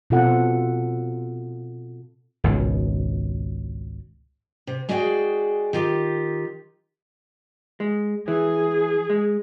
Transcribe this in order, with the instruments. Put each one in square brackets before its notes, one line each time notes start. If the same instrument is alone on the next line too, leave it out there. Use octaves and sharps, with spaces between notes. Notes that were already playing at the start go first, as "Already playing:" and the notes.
[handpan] B2 C4 F4 A4 F#5
[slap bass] G#1 C#2 B2
[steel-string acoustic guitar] C3
G#3 F#4 G#4 D5 E5 G5
D#3 F4 G4
[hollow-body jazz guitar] G#3
[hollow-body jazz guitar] E3 [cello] G#4
[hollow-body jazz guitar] G#3